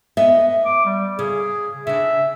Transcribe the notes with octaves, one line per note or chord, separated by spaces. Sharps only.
B3 D#5 E5
D6
G3
C#3 G#4
C#3 D4 E5